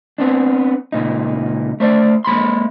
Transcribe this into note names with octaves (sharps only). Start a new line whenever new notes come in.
B3 C4 D4
C#2 A#2 D#4
A3 C5 D5
G#3 A#3 B5 C6